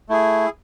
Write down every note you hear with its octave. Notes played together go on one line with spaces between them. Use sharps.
A3 E4 G#4